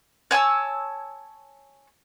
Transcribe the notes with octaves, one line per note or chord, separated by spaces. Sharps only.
C#5 G#5 A5 E6